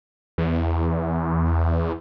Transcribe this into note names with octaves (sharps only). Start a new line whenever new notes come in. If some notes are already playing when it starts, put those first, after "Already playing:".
E2